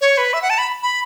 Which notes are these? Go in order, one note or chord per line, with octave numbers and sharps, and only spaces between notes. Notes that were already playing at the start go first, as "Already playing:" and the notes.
C#5
B4
E5
F#5
A5
B5
B5